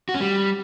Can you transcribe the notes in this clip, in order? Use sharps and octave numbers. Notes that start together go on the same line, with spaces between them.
F#4
C#4
G3